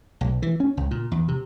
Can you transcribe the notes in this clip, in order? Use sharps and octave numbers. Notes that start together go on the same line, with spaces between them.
B1
E3
C#4
C#2
A#2
E2
C3